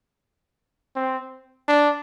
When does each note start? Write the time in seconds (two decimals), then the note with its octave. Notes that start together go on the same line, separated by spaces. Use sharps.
0.96 C4
1.68 D4